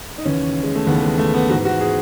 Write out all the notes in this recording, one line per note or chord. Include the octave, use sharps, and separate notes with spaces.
D#4
D#2 C#3 E3 C#4
G#3
A3
D#2 C#3 E3 B3
G#3
A3
B3
G#2 E3 F#4
F#4
G#4